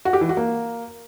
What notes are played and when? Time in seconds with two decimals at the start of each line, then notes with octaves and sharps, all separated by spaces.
0.05 F#4
0.13 G4
0.21 E3
0.29 F#4
0.37 A#3